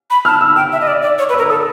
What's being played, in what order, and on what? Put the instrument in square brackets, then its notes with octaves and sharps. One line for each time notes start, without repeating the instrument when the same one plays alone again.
[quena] B5
[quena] A5 [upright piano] F6
[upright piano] E6
[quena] G5 [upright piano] E6
[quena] E5
D#5
D5
D5
C#5
B4
[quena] A#4 [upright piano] E6
[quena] A4 [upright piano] D#6